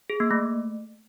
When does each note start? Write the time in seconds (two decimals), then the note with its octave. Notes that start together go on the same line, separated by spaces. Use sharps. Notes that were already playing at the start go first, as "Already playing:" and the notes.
0.10 G#4
0.20 A#3
0.31 A3